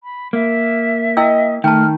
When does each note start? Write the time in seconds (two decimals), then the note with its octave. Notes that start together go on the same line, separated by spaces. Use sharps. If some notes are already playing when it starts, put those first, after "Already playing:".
0.03 B5
0.33 A#3 E5
1.17 E4 D#5 G5 E6
1.64 D#3 A3 G5 A5 F6